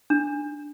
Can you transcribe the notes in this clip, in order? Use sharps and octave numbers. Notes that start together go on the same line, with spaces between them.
D4